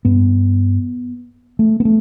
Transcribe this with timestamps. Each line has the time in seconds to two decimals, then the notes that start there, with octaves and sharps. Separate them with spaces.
0.05 G2 B3
1.59 A3
1.80 B3
1.85 A3